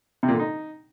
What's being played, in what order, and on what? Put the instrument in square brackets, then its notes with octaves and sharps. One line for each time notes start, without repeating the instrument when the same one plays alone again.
[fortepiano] C3
A#2
D3
D#4